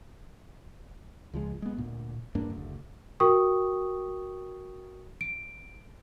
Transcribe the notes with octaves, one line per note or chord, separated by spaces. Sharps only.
C#2 F3 G#3
G#3 B3
D2 A#2
E2 G2 A#3 D4
F#1 D2
F#4 A#4 G5 C#6 D#6
D7